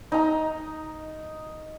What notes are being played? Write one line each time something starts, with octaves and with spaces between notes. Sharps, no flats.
D#4 A#5